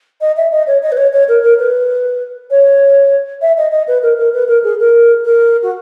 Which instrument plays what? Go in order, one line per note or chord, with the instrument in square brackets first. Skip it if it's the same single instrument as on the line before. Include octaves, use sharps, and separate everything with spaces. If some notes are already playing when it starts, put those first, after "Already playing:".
[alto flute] D#5
E5
D#5
C#5
D#5
B4
C#5
C#5
A#4
A#4
B4
C#5
E5
D#5
D#5
B4
A#4
A#4
B4
A#4
G#4
A#4
A#4
F#4